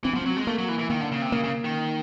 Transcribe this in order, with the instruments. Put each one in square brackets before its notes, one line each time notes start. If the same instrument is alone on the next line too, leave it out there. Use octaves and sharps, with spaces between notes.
[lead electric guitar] E3 [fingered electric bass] C4
[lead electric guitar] F3 [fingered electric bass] B3
[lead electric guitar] F#3 [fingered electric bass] C4
[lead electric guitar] G#3
[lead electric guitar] A3 [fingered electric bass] A#3
[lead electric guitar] F#3
E3
E3
[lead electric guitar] D#3 [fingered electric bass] A#3
[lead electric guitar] D3
C#3
C3
[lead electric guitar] C#3 [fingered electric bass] A#3
[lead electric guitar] C#3
D#3